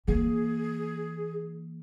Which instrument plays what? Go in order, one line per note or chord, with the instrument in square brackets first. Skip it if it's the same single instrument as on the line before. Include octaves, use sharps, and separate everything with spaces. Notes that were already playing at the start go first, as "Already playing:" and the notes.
[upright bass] E3 A#3 [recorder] G#4